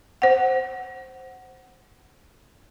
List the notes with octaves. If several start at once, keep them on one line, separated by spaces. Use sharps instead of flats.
C5 F#5